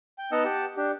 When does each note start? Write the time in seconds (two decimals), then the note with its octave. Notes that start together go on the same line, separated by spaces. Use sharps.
0.18 G5
0.32 B3 D#4 D#5 F#5 A5 E6
0.45 G4 F#5 A5
0.77 D4 G4